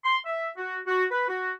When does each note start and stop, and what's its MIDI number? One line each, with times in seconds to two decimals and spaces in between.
0.04 0.18 84
0.26 0.50 76
0.57 0.79 66
0.86 1.05 66
1.11 1.28 71
1.28 1.52 66